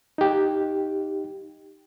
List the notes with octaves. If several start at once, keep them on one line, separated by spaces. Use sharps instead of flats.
D#4 G4